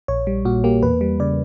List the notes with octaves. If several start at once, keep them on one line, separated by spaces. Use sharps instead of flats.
A#1 C#5
G3
A#2 F#4
A#3 G4
E2 B4
G3
C#3 D5